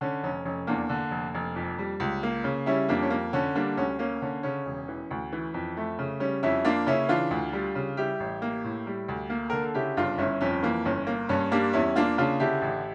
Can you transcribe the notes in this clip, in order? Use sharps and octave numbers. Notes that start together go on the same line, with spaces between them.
D3 C#4
F1 C#4
F1 C#4
E2 A#3 D4
D3
F1
F1
F2
G3
C#2
A#3
C#3
G3 C#4 E4
F2 A#3 D4
C#4
A#3
D3 C#4
G3 A#3 D4
D2 C#4
A#3 C#4
D3 C#4
C#3 C#4
E1
E3
D2
E3
F2
A3
C#3
G3 C#4
F2 C#4 E4
A#3 D4 F4
C#3 C#4 E4
E3 D4 F4
D2
G3
C#3
G3 E4 G4
A1
A#3
A2
G3
D2
A#3
D3 A#4
A4
C#3 E4 G4
G1 D4 F4
G1 C#4 E4
F2 C#4
E3 A#3
G1 C#4
A#3
G2 C#4
G3 A#3 D4
E2 C#4 E4
A#3 D4 F4
C#3 D4 F4
D3 E4 G4
A1